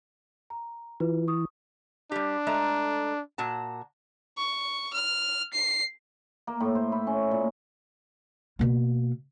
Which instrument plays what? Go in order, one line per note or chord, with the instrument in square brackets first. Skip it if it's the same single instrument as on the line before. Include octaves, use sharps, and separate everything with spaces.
[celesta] A#5
[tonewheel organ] E3 [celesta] F4 B4
[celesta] C#6 D#6
[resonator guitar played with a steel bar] G3 G4 [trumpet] D4
[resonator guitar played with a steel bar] G#3 A3 A#5
A#2 F#4 A5
[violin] C#6
F6
C7
[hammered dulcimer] A#3
A2
C5
E4
C#4
A#2
[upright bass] B2 A#3